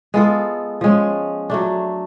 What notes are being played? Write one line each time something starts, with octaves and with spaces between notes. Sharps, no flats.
G#3 B3 F4 A4
F3 G#3 C#4
F#3 A3 D4